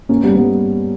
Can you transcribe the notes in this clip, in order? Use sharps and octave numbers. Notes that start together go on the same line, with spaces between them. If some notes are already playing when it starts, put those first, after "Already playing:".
A#3 C#4
G3 B3
G3 B3